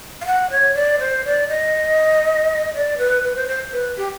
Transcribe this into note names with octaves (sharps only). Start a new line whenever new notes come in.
F5
F#5
C#5
D5
C5
D5
D#5
D5
B4
B4
C5
C5
B4
G4